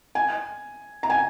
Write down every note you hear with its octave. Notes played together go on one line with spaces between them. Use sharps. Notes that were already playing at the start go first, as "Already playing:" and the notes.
G#5
A#5
G#5